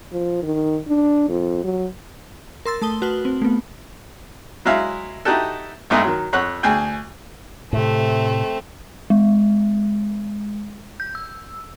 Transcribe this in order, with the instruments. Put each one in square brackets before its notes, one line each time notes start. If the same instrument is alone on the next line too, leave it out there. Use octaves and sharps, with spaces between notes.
[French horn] F3
D#3
D4
F2
F#3
[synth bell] A#4 C6 E6 A6
A3 A5 D#6 G7
F#4 B4 A5 F6 F#7
C4
A3 B3
[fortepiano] F#3 G#3 E4 E5 F5
D#4 E4 F#4 G4 A4
A#1 G2 G#3 A3 D#4
D#3 F#3
F2 C#5 F#5 F#6
D2 G#4 G5
[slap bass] A2 C3 [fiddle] A3 C4
[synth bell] G#3
G6
E6